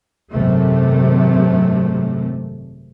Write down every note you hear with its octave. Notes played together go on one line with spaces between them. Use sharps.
G#1 F#2 C3 A3